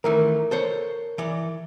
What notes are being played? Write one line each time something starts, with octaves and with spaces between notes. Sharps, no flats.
D#3 E3 A3 A#4
A4 C5 C#5
E3 D5